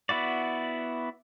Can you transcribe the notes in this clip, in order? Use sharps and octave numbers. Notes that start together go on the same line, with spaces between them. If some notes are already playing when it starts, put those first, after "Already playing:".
B3 E4 F#4 D5